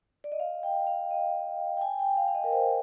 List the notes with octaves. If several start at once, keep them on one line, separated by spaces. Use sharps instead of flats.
D5
D#5
F5
G5
F5
D#5
G5
G#5
G5
F5
F5
D#5
A#4
C5